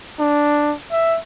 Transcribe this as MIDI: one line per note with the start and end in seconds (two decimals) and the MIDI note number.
0.20 0.75 62
0.91 1.18 76